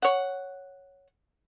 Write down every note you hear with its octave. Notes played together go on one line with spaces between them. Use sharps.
C#5 F#5